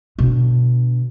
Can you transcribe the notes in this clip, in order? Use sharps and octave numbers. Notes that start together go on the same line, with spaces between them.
B2 D3